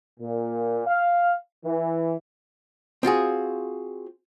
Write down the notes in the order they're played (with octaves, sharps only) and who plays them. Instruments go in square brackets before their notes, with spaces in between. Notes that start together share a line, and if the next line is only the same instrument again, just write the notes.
[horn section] A#2
F5
E3
[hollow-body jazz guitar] C4 F4 F#4 G#4